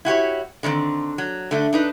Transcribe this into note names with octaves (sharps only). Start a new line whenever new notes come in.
E4 F#4 G4 C#5
D3 D#3 B3 C4
F#3
D3 A3
D4 D#4 B4